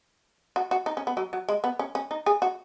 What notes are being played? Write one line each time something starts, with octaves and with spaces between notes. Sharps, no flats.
F#4
F#4
D#4
C#4
B3
F#3
F#3
G#3
B3
C#4
C#4
D#4
G#4
F#4